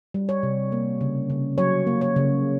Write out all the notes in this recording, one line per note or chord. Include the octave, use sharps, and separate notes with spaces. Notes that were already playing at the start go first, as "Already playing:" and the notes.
G3
C#5
C3
A#3
C#3
C#3
F#3 C#5
A#3
C#5
C#3